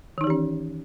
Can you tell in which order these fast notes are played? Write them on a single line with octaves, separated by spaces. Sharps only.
D#3 D#4 E3 G4 C#4